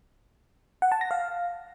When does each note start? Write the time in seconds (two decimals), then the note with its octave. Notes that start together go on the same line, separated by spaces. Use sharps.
0.82 F#5
0.92 A5
1.01 A#6
1.11 F5